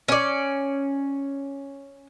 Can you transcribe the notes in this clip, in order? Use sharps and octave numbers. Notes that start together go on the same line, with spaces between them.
C#4 D5